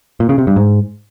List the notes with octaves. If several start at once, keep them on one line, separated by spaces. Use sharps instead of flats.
A#2
C#3
C3
G2
G#2